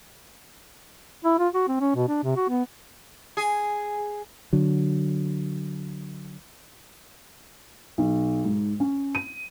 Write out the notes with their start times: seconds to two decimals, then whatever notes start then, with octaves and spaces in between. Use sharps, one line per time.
1.25 E4
1.39 F4
1.54 F#4
1.68 C4
1.80 C#4
1.96 B2
2.08 D4
2.24 C3
2.36 F#4
2.49 B3
3.37 G#4
4.53 D3 F#3
7.98 B1
8.45 G#2
8.80 C#4
9.15 D#7